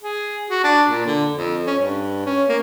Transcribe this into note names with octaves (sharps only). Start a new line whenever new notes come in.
G#4
F#4
D4
A#2
D3
F2
C#4
G2
C#4
A#3